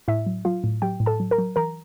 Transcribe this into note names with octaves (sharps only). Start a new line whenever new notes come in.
A2 E4 E5
F#3
F#3 F4 F5
A2
F#3 G4 G5
A2
A4 A5
F#3
A#4 A#5
F#3
E3 A#4 A#5